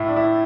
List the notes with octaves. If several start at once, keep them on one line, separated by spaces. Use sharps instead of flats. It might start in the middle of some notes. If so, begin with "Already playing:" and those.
Already playing: A2 E4
D4
E4